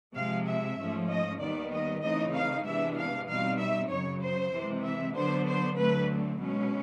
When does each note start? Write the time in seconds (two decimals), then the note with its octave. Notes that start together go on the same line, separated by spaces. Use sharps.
0.14 C3 F3 G#3 F5
0.46 E5
0.78 G#2 F3 A3 C#4
1.08 D#5
1.40 D#2 D#3 G3 B3 D5
1.71 D#5
2.02 C#3 E3 A3 C4 D#4 D#5
2.34 F5
2.64 C3 E3 G#3 B3 D4 E5
2.97 F5
3.27 B2 G3 C4 D#4 F5
3.58 E5
3.89 F#2 C#3 F#3 C#5
4.20 C5
4.53 C3 E3 G#3
4.83 E5
5.15 D3 F#3 B3 D4 C5
5.46 C5
5.77 D2 D3 F#3 A3 C4 B4
6.40 B2 G#3 C#4